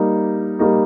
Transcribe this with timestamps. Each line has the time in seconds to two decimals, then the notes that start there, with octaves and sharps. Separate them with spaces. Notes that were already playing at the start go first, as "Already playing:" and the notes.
Already playing: G3 A#3 D#4
0.59 G3 A#3 D#4